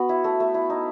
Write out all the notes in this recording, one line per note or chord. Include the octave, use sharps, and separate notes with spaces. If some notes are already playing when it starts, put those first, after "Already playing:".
Already playing: B3 F#4
E4
A3
A3
E4
D#4